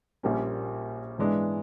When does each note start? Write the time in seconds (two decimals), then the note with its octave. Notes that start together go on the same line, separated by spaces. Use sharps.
0.23 A#1 A#2 G3 A#3 C#4
1.18 G#2 E3 G#3 B3 D4